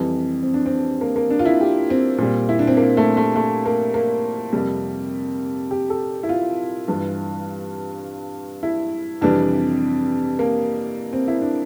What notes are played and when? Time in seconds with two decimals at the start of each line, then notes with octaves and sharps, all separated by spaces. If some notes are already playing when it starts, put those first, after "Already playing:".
Already playing: F2 E3 G3
0.43 C4
0.54 D4
0.66 C4
1.01 A#3
1.16 A#3
1.30 D4
1.39 F4
1.45 E4
1.61 G4
1.90 C4
2.18 A#2 G3
2.49 E4
2.59 D4
2.67 C4
2.77 A#3
2.97 A3
3.17 A3
3.36 A3
3.66 A#3
3.94 A#3
4.53 F2 C3 G3 A#3
5.71 G4
5.90 A4
6.23 E4
6.29 F4
6.88 G2 E3 G3
8.63 E4
9.21 F2 C3 E3 G3 D4
10.39 A#3
11.13 C4
11.28 E4
11.41 D4